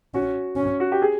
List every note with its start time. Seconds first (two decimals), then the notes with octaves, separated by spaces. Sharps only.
0.14 C#4 F#4
0.56 C#4
0.80 F#4
0.92 G4
1.02 G#4